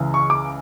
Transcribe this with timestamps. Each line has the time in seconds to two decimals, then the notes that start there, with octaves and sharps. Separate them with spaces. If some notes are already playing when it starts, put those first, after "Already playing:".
Already playing: C#2 C#3 E3
0.14 C#6
0.30 D6